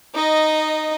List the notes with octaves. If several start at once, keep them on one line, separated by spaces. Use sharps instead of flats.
D#4 D#5